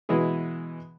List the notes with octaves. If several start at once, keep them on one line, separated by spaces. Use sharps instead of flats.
B2 E3 G#3 E4 G#4